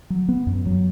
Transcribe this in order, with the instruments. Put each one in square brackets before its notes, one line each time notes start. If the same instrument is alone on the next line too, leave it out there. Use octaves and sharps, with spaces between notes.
[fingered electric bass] F#3
B3
F#2
F#3